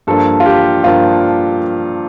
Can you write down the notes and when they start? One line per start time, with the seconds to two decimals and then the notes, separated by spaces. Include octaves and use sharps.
0.07 G2 F3 A#3 D4 A4
0.40 F4
0.46 G4
0.84 G2 F3 A#3 D4 F4